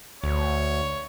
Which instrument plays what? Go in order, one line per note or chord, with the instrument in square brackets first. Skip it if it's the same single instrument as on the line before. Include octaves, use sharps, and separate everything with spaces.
[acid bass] D2 [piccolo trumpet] C#5